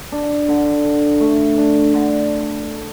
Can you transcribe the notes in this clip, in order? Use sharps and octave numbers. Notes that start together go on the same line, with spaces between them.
D4
D3
D3
A3
D4
D3